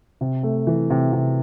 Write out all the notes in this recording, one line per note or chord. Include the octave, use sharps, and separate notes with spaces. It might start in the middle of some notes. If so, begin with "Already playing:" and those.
C3
A3
E3
C3
C3